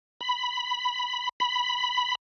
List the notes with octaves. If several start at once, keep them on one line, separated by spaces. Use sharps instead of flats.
B5
B5